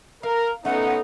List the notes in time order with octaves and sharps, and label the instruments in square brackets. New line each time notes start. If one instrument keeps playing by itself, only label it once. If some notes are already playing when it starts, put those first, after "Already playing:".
[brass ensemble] A#4 [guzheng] F5
[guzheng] A3 [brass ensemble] B3 C#4 D#4 [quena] F#5